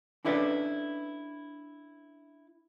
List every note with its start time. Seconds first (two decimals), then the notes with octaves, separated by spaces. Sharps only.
0.25 C#4 D4 E4 A4 B4 D5